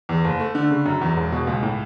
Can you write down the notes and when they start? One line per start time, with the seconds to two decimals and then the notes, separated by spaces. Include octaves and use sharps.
0.09 E2
0.25 F#1
0.40 A3
0.55 D3
0.71 C#3
0.86 F#2
1.01 E2
1.17 E1
1.32 B2
1.47 C#2
1.63 A2